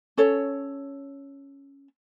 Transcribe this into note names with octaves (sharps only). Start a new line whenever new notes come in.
C#4 A4 C#5